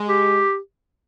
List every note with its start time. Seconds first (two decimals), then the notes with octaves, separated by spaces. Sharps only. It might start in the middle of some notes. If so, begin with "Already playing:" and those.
Already playing: G#3
0.08 G4